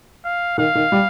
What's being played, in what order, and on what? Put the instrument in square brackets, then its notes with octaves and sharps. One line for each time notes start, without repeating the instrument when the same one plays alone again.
[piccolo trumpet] F5
[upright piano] D#3 [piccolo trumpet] F5
[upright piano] D#3
G3